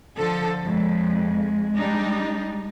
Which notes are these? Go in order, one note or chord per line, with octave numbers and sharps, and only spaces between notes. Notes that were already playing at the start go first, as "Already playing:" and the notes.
D3 F3 A4
F2 G#3
G3 D4 D#4